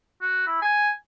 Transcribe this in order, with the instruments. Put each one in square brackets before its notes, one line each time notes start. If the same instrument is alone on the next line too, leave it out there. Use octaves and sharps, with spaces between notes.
[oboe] F#4
E4
G#5